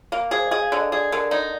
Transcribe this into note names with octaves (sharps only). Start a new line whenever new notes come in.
A#3
G#4 C5
G#4 D#5
F5
D3
D#5
G#4 D5
D3 A#4
D#4 D5